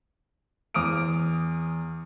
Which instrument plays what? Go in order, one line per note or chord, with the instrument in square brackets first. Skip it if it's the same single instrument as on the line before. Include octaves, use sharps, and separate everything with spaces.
[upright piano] E2 D6 D#6 F6 D7